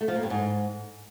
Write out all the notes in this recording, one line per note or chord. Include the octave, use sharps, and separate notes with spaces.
A3
F3
A#3
G2
G#2